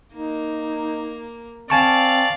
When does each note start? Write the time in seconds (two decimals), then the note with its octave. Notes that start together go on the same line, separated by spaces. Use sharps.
0.15 A#3 D#4
1.70 C4 D5 F5 G#5 A5 C#6